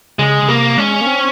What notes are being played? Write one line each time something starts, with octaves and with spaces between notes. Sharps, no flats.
C#3 G#3
C#3
C3 A#3
G#3 C#4
A#3
C4